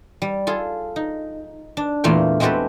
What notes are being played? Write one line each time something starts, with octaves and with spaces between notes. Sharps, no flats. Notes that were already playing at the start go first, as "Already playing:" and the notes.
G3
F4 G#4 A4
D#4
D4
E2 A#2 A3 A#3 F4 G5
G#3 C4 F#4 G4 A4 B4